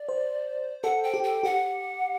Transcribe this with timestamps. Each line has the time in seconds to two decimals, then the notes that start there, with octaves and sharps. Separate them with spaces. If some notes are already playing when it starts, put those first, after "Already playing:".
Already playing: D5
0.09 C5
0.84 A4 F#5
1.03 G5
1.14 G4
1.24 G5
1.43 G4 F#5